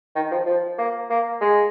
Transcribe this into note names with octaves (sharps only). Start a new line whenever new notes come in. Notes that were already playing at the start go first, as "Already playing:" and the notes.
D#3
F3
F3
A#3
A#3
G#3